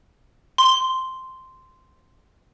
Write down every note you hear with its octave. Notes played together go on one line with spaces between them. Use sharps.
C6 G7